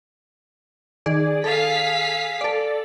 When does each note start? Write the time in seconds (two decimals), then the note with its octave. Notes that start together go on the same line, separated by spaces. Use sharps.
1.06 D#3 G#4 D5
1.44 G#4 A4 F5 B6
2.41 A4 D5